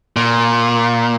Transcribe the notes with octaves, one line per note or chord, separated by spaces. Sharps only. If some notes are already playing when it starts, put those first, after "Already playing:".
A#2